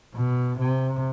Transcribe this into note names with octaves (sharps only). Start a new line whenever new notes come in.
B2
C3